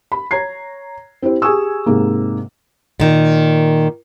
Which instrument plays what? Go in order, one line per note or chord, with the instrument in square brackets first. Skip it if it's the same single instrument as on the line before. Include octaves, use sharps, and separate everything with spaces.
[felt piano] B5
C#5 A#5 G#6 C7
C4 E4 G4 C5
G4 G#4 G#5 C#6 D#6 E6
G#2 C3 G#3 A#3
[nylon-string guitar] A#2 D#3